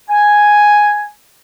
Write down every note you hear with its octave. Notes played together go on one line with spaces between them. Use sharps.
G#5